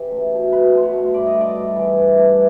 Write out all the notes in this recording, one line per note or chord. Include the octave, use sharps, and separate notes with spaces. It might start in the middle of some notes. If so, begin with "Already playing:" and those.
Already playing: C#3 E3 G4
A3
B2
F#3 B4
B2 C5
C#5
A3
G2 D5
D#5
A3
D5
G2
E3
G2
A3